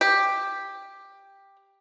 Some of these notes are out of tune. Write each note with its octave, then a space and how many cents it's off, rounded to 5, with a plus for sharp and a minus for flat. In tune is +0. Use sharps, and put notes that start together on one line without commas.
G4 +5